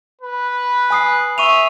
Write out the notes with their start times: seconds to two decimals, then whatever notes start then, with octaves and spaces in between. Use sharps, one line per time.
0.22 B4
0.90 G#5 D#6 C7
1.38 E5 C#6 D#7 F7